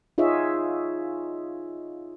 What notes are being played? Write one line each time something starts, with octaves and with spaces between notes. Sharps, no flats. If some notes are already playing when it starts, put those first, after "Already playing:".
D#4 F4 G#4 C#5 E5